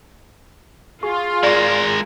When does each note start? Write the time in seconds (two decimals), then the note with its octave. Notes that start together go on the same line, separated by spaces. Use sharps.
1.03 F4 G#4 C#6
1.43 G#3 A#4 D5 F5 C#6